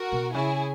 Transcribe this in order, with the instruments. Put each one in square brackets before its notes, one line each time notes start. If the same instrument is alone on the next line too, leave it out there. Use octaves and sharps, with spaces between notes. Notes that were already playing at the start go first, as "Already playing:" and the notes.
Already playing: [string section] F#4 A#4
[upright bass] B2
[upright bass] C#3 [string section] E4 G#4